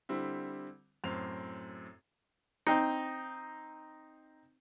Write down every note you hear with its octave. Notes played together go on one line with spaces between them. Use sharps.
D3 G3 C4 E4
F#2 A2 C4 F7
C4 D#4